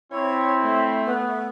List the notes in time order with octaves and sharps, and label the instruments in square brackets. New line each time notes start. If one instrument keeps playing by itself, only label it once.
[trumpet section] C4 E4 [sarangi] C#5
[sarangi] A3
[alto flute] B3